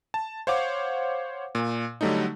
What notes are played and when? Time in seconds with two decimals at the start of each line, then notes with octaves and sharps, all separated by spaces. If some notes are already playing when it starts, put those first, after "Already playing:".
0.14 A5
0.47 C5 C#5 F5 F#5 D6
1.55 A#2
2.01 D3 F#3 G3 A3 D4 D#4